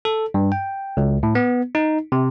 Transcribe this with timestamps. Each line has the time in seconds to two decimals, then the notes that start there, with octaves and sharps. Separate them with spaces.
0.05 A4
0.34 G2
0.52 G5
0.97 C#2
1.23 A2
1.35 B3
1.75 D#4
2.12 C3